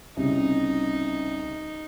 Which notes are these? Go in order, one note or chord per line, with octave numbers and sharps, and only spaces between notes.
C2 C#3 D#4